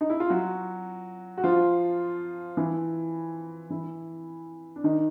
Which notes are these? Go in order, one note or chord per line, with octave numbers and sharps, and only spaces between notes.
D#4
E4
F4
F#3 F#4
F#4
F3 F4
E3 E4
E3 E4
D4
D#3 D#4